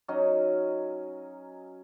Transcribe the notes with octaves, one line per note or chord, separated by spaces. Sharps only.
F#3 C#4 D#4 D#5